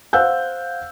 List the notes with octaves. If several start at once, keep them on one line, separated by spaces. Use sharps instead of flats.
C5 F5 F#5 E6 F#6 G6